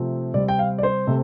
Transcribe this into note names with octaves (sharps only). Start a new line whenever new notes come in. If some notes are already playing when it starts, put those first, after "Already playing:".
Already playing: C3 F3 A3 C4
C3 G3 C4 D5
G5
F5
D5
C5
C3 A3 C4